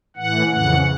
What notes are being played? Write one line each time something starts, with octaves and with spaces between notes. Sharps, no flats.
A2 E3 F#5
F2 C#3 E3 F#5